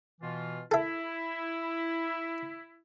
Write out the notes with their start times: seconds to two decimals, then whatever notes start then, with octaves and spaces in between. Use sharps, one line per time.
0.21 B2 E3 F4
0.71 E4 A4 E5